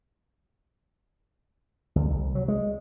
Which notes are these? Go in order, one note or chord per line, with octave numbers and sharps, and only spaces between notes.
D2
C2
F#3
G#3